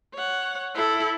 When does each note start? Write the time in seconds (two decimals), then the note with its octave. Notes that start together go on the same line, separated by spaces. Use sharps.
0.15 C#5 F#5
0.75 E4 A4